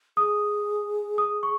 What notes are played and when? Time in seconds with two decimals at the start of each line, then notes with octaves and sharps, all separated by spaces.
0.17 G#4 D#6
1.18 D#6
1.43 C#6